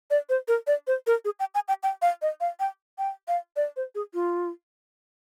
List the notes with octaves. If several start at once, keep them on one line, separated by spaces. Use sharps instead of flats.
D5
C5
A#4
D5
C5
A#4
G#4
G5
G#5
G5
G5
F5
D#5
F5
G5
G5
F5
D5
C5
G#4
F4